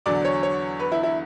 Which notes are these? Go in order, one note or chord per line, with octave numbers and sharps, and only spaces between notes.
E2 D3 F#3 D5
C#5
C#5
B4
E4
E4